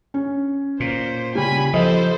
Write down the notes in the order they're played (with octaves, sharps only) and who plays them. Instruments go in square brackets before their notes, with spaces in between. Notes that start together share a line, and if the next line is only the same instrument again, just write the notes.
[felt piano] C#4
[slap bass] A#2 [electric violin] C5
[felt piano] C#3 G3 C#4 [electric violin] G#5 B5
[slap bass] F3 [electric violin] A4 C5 [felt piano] D#5